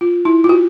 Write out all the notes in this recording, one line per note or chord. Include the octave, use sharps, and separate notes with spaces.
F4
E4
F4
F#4